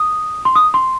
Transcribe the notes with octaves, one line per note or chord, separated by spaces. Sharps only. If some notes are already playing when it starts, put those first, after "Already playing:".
Already playing: D#6
C6
D#6
C6